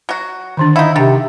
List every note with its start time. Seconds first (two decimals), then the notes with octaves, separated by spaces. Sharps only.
0.09 F#3 F#4
0.57 D3 D#3 D4
0.76 D#4 E4 F5 F#5
0.96 C3 D#3 D4